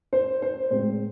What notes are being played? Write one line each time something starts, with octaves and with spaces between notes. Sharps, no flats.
C5
C5
A2 G#3 C4 C5